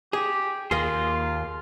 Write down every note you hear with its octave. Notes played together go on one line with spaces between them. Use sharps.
G4 G#4
D#2 A#3 F4 G#4 C6